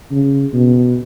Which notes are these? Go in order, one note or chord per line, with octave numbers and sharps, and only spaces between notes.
C#3
B2